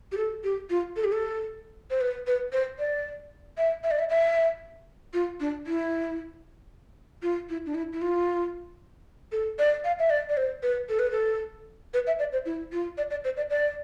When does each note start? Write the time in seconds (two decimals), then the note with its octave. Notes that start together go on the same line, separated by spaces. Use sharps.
0.12 G4
0.17 A4
0.44 G4
0.70 F4
0.96 A4
1.04 G4
1.12 A4
1.91 C5
2.01 B4
2.27 B4
2.53 C5
2.79 D5
3.58 E5
3.84 E5
3.91 D5
3.99 E5
4.10 E5
5.14 F4
5.40 D4
5.67 E4
7.22 F4
7.49 E4
7.66 D4
7.75 E4
7.93 E4
8.02 F4
9.32 A4
9.59 D5
9.84 F5
9.99 E5
10.10 D5
10.29 D5
10.37 C5
10.63 B4
10.89 A4
10.99 B4
11.11 A4
11.94 B4
12.07 E5
12.19 D5
12.33 C5
12.46 E4
12.72 F4
12.98 D5
13.10 D5
13.24 C5
13.37 D5
13.50 D5